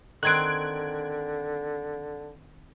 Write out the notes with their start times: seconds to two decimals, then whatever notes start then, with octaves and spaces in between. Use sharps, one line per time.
0.23 D3 D#3 C4 F#6 G#6 D7